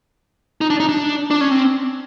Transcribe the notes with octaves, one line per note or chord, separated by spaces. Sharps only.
D#4
D4
D#4
D4
D4
C#4
C4